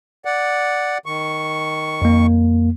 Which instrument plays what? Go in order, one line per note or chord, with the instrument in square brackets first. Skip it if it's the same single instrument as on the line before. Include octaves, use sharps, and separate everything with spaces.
[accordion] D5 F#5
D#3 C#6
[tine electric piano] F2 A#3